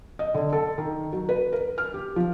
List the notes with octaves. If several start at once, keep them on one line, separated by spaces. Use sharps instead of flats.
D#5
D3
A4
D#3
F#3
B4
A#4
F6
G4
F3